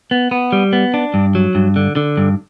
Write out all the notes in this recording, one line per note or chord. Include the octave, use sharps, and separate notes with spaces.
B3
B3
G3
B3
D4
G2
F#3
G2
D3
D3
G2